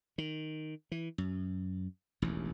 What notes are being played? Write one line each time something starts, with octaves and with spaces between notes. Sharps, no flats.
D#3
E3
F#2
E1 A1 D#2